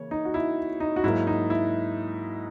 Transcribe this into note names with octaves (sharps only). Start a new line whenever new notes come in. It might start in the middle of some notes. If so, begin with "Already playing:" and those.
Already playing: C#3 E3 A#3 C#5
D#4
F#4
E4
D#4
F#4
G#2 F#3 A#3 E4
D#4
E4